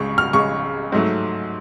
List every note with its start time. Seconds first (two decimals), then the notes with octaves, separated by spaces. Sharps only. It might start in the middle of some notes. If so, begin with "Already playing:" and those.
Already playing: C#2 C#3 G#3 C#6
0.18 F6
0.33 C#2 C#3 G#3 C#6
0.92 G#2 F#3 A3